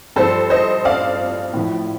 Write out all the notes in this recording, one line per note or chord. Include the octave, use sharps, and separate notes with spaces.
G2 F3 A4 C5
C5 D#5
D5 F5
A2 F3